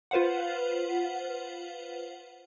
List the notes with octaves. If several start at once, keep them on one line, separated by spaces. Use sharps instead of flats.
F4 B4 C5 F5 F#5